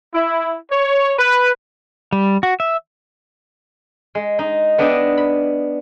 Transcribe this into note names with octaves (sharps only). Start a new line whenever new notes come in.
E4
C#5
B4
G3
F#4
E5
G#3
D#4
B3 D4 D#5 E5 G5
B5